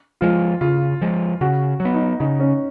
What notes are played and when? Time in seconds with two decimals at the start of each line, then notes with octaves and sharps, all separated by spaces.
0.21 F3 G#3 F4
0.61 C#3 F4
1.01 F3 G#3
1.41 C#3 F#4
1.80 F#3
1.85 B3
1.94 D#4
2.20 C#3 D#4
2.40 C#4